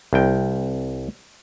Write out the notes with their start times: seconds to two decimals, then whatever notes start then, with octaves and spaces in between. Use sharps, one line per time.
0.13 C2 G5